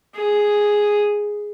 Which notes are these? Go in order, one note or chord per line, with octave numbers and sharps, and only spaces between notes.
G#4